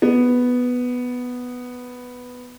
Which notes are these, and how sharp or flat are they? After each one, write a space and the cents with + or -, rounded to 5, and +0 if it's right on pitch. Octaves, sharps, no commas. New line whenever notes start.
B3 +0